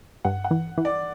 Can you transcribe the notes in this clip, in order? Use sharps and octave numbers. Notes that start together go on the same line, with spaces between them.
G2 F#5
F#5
E3
E3
D5